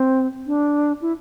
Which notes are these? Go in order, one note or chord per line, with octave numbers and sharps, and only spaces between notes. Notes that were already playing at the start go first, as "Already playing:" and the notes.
Already playing: C4
D4
E4